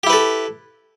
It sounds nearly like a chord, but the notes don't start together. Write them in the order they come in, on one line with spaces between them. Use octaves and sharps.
G4 E4 B4 A4